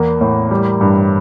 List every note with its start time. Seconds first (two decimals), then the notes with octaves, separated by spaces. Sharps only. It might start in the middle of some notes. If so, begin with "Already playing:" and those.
Already playing: E2 A#3
0.21 A2
0.51 G3
0.81 G2